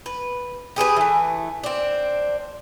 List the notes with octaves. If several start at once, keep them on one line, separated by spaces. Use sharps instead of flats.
B4
G4 G#4 A#4 B4
E3 A3
C4 D4